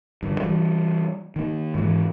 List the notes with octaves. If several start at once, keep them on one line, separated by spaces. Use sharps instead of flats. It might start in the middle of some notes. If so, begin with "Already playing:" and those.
G2 D3
E3 G3
D#3 A#3
G#2 E3